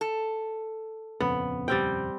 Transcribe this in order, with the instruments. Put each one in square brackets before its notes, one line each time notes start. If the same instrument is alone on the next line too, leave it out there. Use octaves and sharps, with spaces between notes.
[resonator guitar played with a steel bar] A4
[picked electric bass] D#1 F2 C#3 [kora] B3
[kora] G3 C4 G5